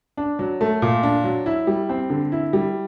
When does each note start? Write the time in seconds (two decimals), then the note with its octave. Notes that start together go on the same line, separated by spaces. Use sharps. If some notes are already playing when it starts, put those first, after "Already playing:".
0.17 D4
0.39 F#3
0.61 A3
0.82 A#2
1.03 D4
1.24 F#3
1.46 E4
1.67 G3
1.89 C4
2.10 D3
2.32 E4
2.53 G3